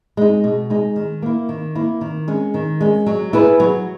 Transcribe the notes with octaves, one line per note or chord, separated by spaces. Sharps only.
G#3 D#4
B2
G#3 D#4
D#3
A#3 E4
D#3
A#3 E4
D#3
G#3 C#4
D#3
G#3 C#4
F#3
B3 E4 G#4 B4
F#3